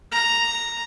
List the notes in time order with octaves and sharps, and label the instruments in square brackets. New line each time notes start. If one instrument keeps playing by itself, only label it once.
[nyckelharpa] A#5